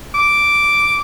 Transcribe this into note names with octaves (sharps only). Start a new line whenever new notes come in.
D6